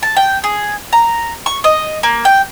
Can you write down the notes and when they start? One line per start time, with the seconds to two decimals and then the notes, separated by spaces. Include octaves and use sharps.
0.03 A5
0.17 G5
0.44 G#4
0.93 A#5
1.46 C#6
1.64 D#5
2.03 A#3
2.25 G5